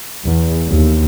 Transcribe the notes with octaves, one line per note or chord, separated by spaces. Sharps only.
E2
D#2